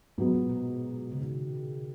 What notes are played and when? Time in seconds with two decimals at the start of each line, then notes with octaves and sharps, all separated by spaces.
0.18 G#2 B2 F#3 B3
0.34 A#2
0.49 B2
1.12 C#3
1.22 D#3